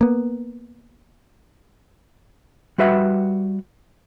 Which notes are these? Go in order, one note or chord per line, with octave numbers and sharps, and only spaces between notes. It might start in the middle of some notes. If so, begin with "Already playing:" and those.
A#3 B3
G3 F#4 B4 E5 F#5